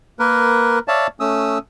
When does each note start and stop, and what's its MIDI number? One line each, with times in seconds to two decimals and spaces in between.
0.19 0.79 58
0.19 0.79 70
0.19 0.79 71
0.88 1.07 73
0.88 1.07 74
0.88 1.07 76
0.88 1.07 77
0.88 1.07 81
1.20 1.58 57
1.20 1.58 61
1.20 1.58 87
1.20 1.58 88